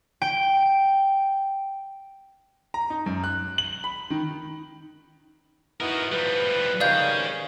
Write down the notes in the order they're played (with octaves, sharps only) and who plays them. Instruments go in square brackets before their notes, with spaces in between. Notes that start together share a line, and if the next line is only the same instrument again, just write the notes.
[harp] G5 D7
[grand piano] A#5
D#4
F#2
F#6
F#7
B5
D#3
[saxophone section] B3 D#4 E4 [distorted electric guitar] F#4 A#4
[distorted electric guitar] F3 G3 [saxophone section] B4
[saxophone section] G#2 C3 D#3 [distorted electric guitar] G#4 C#5 [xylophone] D5 F5 G6